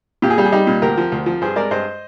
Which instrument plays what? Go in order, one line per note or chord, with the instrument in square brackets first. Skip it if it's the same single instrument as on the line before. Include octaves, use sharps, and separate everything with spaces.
[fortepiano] A#2 G4
G#4
G3 G4
G#4
G3 D#4 G4
A#2
D2 G4 A#4
F3
D2
F3
G2 G#4 C5
G#3 A#4 D5
G2 C5 D#5